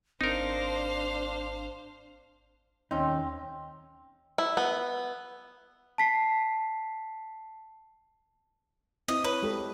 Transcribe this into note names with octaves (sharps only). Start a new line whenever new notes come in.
G#1 C4 D4 D#4 A#4 C5 F5
D#2 C4 C#4 D#4
E4
B3
A5 B6 C7
C4 E4 D#5
B4 C#5
G#3 G4 A4